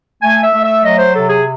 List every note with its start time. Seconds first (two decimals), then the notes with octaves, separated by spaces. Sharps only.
0.22 A3 G#5
0.43 E5
0.53 A3
0.63 E5
0.84 F#3 D#5
0.99 C5
1.14 C3 A4
1.30 G#4